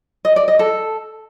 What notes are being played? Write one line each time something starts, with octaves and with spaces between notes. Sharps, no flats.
D#5
D5
D#5
A4